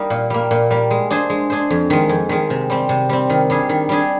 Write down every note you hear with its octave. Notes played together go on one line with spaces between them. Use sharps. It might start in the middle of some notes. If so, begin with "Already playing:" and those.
Already playing: G3 A#3 D#4 A#4
A#2
G3 A#3
A#2
G3 A#3
G#3
D4 G#4 C5
G#3
D4 G#4 C5
F2
D#3 G#3
F2
D#3 G#3
C3
G3 C4
C3
G3 C4
D#3
G3 D4 G#4
D#3
G3 D4 G#4